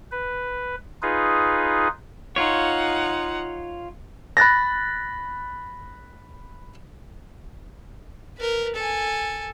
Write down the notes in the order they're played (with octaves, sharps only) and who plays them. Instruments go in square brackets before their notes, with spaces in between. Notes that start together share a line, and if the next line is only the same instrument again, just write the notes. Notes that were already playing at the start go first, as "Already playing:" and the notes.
[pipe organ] B4
D#4 F4 G#4 B4
[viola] D#4 F#5 [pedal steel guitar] F4 C#5
[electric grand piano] B5 F#6 A6 A#6
[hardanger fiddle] A#4 B4
A4 G#5